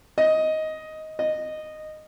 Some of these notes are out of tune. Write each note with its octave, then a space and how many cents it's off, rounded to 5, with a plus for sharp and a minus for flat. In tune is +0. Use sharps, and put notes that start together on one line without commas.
D#5 +10
D#5 -10